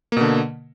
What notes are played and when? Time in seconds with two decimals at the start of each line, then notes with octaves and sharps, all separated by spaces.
0.12 A#3
0.17 B2
0.21 D3